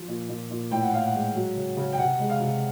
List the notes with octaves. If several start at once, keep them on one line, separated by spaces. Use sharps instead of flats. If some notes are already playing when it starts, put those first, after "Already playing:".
Already playing: F3
A#2
A#2
A#2
A2 G5
F#5
A2 F5
F#5
G#3
F#3
C#3
C#3
G5
C3 F#5
G#3
F5
C3